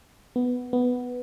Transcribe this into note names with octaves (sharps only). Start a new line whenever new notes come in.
B3
B3